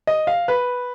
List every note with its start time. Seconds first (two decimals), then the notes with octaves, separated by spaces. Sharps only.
0.07 D#5
0.27 F5
0.48 B4